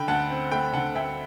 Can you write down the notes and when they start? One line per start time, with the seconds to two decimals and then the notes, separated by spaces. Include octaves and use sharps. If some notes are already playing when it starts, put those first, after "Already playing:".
Already playing: D3 G5 B5
0.08 D2 F#5 A5
0.30 C4
0.51 A3 G5 B5
0.65 B5
0.73 D3 F#5 A5
0.95 D2 E5 G5